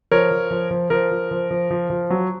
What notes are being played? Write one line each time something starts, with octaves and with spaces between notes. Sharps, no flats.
F3 A#4 C#5
F3
F3
F3
F3 A#4
F3
F3
F3
F3
F3
F#3